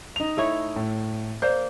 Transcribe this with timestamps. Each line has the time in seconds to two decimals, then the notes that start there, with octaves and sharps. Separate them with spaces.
0.16 D#4 F7
0.37 A3 E4 C#5
0.76 A2
1.42 A#3 C5 D5 G6